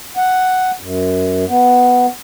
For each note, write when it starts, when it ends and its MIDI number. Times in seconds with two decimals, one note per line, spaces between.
0.17 0.71 78
0.81 1.45 42
1.49 2.06 59